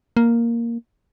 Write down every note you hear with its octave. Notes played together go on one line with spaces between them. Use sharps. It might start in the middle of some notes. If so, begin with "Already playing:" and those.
A#3